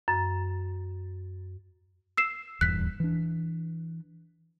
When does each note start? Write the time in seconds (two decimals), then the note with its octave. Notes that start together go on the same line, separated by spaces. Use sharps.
0.08 F#2
2.17 E6 C7 E7
2.61 D#1 E2 G2 F#6 B6
3.00 E3 D4